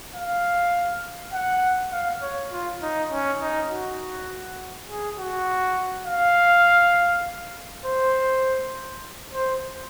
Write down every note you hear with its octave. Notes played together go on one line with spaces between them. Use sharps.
F5
F#5
F5
C#5
F4
D#4
C#4
D#4
F#4
G#4
F#4
F5
C5
C5